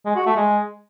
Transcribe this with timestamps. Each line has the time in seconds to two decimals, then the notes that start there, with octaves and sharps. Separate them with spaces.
0.06 G#3
0.16 F#4
0.26 A3
0.37 G#3